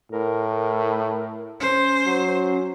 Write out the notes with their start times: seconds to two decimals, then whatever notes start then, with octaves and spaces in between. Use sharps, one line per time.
0.12 A2 A#4
1.60 C#4 C5
2.06 F#3